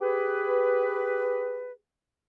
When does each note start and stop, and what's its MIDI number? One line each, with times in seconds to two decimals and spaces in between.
0.01 1.73 67
0.01 1.73 68
0.01 1.73 71